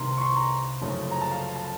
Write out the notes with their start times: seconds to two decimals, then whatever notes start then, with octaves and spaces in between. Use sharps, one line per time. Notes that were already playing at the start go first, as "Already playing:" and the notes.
Already playing: C2 C3 D#3 A#3 A#5 C6
0.17 C#6
0.21 C6
0.36 A#5
0.81 F#1 F#2 C#3 F3 A3
1.11 A#5
1.21 A5
1.31 F5
1.56 A5